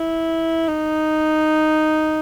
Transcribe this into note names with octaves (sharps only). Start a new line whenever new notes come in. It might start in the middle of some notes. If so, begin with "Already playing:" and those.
Already playing: E4
D#4